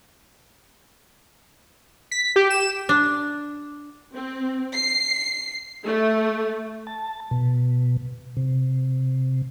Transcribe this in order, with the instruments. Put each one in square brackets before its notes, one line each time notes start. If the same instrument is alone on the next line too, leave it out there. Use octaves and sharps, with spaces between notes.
[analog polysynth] B6
G4
E7
[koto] D4
[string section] C4
C7
A3
[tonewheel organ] A5
B2
C3